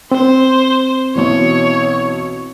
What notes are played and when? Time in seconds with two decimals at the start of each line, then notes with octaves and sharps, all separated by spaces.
0.12 C4 C5
1.15 B1 E3 C#5